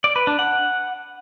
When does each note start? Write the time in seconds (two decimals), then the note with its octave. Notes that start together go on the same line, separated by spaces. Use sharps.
0.04 D5
0.16 B4
0.27 D4
0.39 F#5